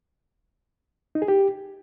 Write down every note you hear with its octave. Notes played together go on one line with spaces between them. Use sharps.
D#4
G#4
G4